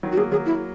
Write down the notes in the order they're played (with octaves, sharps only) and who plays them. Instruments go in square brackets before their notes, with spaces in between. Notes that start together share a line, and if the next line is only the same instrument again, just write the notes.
[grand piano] D#3 F#3
[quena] F#4
[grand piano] F#3 A#3 [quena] G#4
[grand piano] F#3 A#3 [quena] G#4
[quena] E4